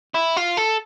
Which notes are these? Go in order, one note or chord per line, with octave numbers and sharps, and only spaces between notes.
E4
F4
A4